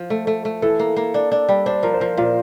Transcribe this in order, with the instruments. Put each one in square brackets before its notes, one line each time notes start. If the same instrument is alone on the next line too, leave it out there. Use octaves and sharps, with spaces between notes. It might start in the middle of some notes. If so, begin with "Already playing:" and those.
Already playing: [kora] F3
A3
A3
A3
[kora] E3 [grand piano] A4
[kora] A#3
A#3
D4
D4
G3
[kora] D4 [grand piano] C5
[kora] F3 [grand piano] A#4
[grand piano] C5
[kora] F3 [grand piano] A#4
[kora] A#2 [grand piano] F4